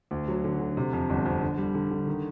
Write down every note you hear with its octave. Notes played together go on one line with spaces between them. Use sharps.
D2
F#3
D3
D3
C3
F2
G1
F2
D3
G3
D3
D3
D#3